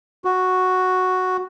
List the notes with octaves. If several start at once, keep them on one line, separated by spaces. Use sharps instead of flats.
F#4